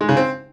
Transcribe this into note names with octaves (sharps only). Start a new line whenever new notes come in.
G#3
C#3
C4